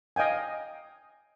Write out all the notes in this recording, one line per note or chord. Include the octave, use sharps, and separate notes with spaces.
D#5 F5 G5 G#5